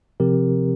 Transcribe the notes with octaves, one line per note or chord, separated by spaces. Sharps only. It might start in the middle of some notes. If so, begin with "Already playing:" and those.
C3 F3 C4 G4 A#4